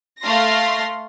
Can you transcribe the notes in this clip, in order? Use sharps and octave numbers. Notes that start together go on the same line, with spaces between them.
A3 F5 C6 A#6